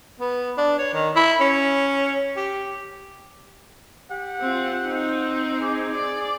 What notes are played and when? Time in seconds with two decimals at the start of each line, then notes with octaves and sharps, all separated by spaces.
0.20 B3
0.57 D4
0.78 C#5
0.93 D#3
1.16 E4
1.40 C#4
2.36 G4
4.10 G4 F#5
4.41 C4 F4
4.84 C4 D#4
5.61 G#4 D6
5.95 D5